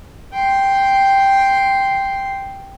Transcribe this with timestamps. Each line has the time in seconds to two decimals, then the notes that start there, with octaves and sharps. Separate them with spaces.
0.33 G5 C6